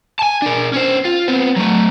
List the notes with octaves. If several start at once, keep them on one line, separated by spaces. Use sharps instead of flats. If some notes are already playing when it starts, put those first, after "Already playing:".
G#5 A5
D4 A#4
C#4 C5
F4
B3 C4
F#3 A3